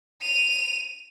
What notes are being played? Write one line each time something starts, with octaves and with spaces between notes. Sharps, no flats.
D#7 F7